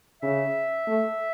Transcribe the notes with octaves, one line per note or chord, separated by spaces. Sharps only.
C#3 E5
A3